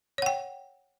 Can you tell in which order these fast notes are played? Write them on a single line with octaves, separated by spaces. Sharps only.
C#5 F#5 G5